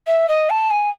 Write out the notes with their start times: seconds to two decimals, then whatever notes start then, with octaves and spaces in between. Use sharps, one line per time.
0.07 E5
0.28 D#5
0.50 A5
0.70 G#5